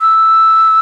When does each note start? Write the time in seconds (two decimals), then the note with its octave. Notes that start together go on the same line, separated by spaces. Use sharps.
0.01 E6